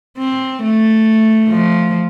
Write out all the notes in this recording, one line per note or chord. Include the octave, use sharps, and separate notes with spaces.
C4
A3
F3